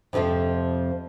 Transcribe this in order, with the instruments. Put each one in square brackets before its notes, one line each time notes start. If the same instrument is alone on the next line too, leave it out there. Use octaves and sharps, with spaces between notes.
[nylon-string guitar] F2 C3 E3 F3 F4